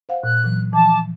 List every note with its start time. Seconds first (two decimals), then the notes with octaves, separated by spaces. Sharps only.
0.09 C5 F5 F#5
0.24 A#2 F#6
0.44 A#2 E3 F#3
0.73 E3 F3 A5 D6